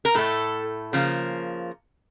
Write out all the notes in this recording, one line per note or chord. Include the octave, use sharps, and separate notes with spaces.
A#4
A2 A3 A4
C#3 F3 A#3